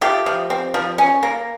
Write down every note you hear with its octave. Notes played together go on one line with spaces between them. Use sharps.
A3 F4 G4
F3
C4
F3
C#4
A#3